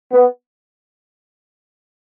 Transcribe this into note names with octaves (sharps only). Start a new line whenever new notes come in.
B3